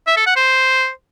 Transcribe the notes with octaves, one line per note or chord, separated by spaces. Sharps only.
E5
A4
F#5
C5